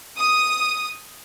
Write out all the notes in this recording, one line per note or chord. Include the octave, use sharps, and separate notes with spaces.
D#6